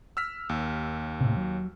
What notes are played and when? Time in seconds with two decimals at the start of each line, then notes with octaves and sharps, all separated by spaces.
0.17 E6 F6 B6
0.49 D#2
1.21 A2 C3
1.37 F#3